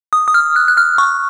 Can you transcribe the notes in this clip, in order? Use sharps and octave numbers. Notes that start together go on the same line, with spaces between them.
D#6
D#6
F6
F#6
F#6
F6
C#6